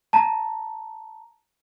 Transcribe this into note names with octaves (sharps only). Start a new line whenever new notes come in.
A5 A#5